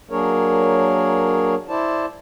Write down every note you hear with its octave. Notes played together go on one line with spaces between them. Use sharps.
F#3 A#3 D4 G#4 A#4 C#5
E4 C5 D5 A5